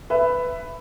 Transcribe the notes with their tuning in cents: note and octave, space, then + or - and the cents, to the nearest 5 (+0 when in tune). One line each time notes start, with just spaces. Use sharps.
B4 +10 E5 +10